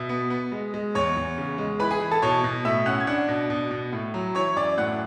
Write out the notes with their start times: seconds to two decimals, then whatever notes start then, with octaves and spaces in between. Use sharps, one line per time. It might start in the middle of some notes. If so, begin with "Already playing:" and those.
Already playing: B2 E5
0.09 B3
0.30 B3
0.52 G#3
0.74 G#3
0.95 E2 C#5 C#6
1.17 E2
1.38 C#3
1.58 G#3
1.80 E3 B4 B5
1.90 G#4 G#5
2.01 E3
2.11 A4 A5
2.22 B2 C#5 C#6
2.44 B2
2.65 A2 E5 E6
2.86 C#4 F#5 F#6
3.00 G#6
3.07 D4 F#5 F#6
3.29 B2
3.50 B2
3.71 B2
3.93 A2
4.14 F#3
4.35 E3 C#5 C#6
4.56 F#2 D5 D6
4.77 A2 F#5 F#6